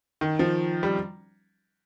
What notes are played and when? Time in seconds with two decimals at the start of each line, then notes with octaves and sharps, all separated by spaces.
0.21 D#3
0.39 F3
0.83 G3